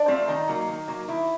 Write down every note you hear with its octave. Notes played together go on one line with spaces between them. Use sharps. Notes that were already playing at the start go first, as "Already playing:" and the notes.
Already playing: D4
F3 A3 C4
D#3 D#4
F#3 A#3
D#3
F#3 A#3
D#3 E4